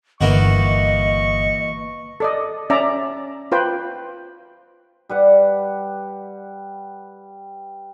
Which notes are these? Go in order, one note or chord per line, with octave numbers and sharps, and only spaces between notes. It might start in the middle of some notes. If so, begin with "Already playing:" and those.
G1 E3 A#3 F#4 D#5 C#6
A4 D5 D#5
C#4 D5 E5 A#5
F4 B4 C5 G5
G3 B4 F#5